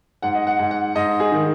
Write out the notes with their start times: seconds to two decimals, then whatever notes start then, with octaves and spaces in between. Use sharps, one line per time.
0.22 G#2 F#5
0.35 D#5
0.47 F#5
0.59 G#2
0.71 F#5
0.95 G#2 D#5
1.20 G#4
1.32 D#3